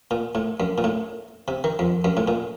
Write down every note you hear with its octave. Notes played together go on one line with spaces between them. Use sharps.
A#2
A2
F#2
A#2
A2
C3
D#3
F2
F#2
A2
A#2